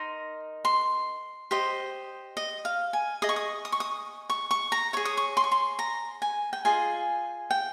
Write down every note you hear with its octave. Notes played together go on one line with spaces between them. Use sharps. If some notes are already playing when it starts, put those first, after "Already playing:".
Already playing: D#4 A#4 D#5 C6
C6
G4 C5 D#5
D#5
F5
G#5
G#4 D#5 D#6
C#6
D#6
D#6
C#6
D#6
C#6
C#6
A#5
G#4 C#5 C#6
D#6
C#6
C6
C#6
C6
A#5
G#5
G5
F4 G#4 D#5 G#5
G5